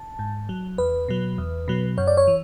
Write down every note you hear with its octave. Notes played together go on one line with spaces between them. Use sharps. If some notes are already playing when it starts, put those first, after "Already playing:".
Already playing: A5
G#2
F#3
E2 B4
B2 F#3
E2
B2 F#3
F#2 C#5
D5
C#5
E3